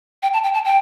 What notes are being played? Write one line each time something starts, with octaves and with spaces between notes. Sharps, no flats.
G5
A5
G5
A5
G5